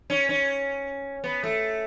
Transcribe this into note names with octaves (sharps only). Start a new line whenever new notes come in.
C#4
C#4
B3
A3